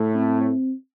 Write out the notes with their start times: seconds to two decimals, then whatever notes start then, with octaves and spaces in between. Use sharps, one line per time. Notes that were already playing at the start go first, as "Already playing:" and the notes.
Already playing: A2 A3
0.15 C4